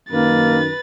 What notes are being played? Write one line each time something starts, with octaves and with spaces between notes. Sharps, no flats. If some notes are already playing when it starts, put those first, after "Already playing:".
F#2 D#3 A#3 B4 A6